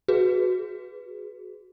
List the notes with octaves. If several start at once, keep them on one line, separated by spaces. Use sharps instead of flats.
F#4 G#4 B4